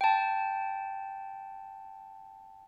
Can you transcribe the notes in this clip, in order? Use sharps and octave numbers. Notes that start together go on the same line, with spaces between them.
G5 A5